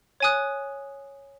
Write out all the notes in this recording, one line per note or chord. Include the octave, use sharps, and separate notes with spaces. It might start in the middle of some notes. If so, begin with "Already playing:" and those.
C#5 G#5 D#6 F#6